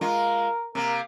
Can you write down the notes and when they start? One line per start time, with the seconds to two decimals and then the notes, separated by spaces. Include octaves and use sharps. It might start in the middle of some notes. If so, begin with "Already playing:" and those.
0.01 G#3 F4 A#4
0.75 C3 A#3 A#4